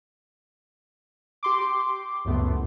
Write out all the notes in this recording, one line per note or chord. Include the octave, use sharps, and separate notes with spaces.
G4 C6 D6
C#2 F#2 A2 A3 B3